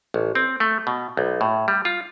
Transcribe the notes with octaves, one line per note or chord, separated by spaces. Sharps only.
A1
C4
A3
B2
B1
A2
G3
F4